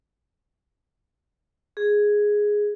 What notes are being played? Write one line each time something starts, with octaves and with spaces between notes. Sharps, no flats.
G#4